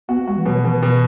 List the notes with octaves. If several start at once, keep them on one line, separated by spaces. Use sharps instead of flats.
B3 F#4
G#3 F#4
E3
B2 F#3
B2 E3
B2 E3